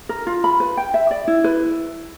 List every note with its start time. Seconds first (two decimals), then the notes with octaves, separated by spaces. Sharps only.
0.09 A#4
0.27 F4
0.44 B5
0.60 B4
0.77 G5
0.94 E5
1.11 D5
1.27 E4
1.44 B4